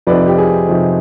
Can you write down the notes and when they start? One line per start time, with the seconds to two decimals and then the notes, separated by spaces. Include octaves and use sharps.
0.07 F2 C3 F3 C4 D#4 B4 D5
0.28 G4
0.38 G#4
0.68 F2 C3 F3 C4 D#4